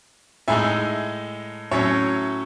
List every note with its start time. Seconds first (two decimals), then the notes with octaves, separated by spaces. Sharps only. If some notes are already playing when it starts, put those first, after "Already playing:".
0.48 A2 G#3 D#4 E5 G#5
1.71 A2 F#3 C#4 C#5 E5